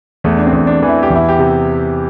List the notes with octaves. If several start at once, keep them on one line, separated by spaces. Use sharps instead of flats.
E2 A3
D4
C4
E2
D4
E3
E4
G4
E2
E4
G4
C3